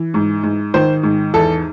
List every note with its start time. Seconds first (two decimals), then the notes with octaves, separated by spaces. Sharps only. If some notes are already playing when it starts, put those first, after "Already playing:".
Already playing: E3
0.14 G#2
0.43 G#2
0.74 D#3 C5
1.03 G#2
1.34 E2 A4